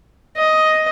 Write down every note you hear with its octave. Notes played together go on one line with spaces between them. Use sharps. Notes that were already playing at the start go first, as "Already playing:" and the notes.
D#5